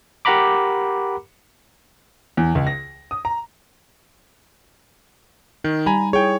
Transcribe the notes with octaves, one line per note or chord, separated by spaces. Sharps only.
G4 A#4 F#5 A#5 B5 D6
E2
C#2
A#6
D#6
A#5
D#3 D#4
G3 G#5 A#5 B5
E4 G#4 C#5 G5